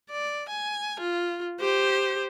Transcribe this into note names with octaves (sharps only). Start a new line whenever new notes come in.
D5
G#5
F4
G4 C5